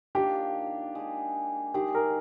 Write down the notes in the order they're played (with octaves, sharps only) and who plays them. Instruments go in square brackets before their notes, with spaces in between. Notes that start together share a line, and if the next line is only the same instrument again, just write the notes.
[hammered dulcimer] D#3 A#3 D4 F4 [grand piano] G4
[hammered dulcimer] G#3 D4 G#4
[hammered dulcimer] D#3 G#3 D#4 G#4 [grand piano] G4
[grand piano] A#4